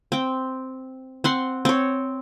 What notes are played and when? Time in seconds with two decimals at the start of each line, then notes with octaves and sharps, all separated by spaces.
0.12 C4 G5
1.24 C4 F#5 C6
1.65 C4 C#5